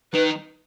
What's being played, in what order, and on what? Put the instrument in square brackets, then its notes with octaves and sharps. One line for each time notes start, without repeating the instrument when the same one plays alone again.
[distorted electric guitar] D#3 [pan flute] B4